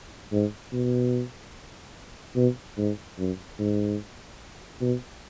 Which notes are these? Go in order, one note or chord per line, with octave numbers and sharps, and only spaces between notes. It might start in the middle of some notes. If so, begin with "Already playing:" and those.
G#2
B2
B2
G#2
F#2
G#2
B2